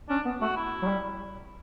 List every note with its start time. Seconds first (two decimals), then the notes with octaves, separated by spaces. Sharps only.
0.09 C#4 D4
0.25 B3
0.41 A3 F#4
0.56 E4
0.82 F#3
0.87 G3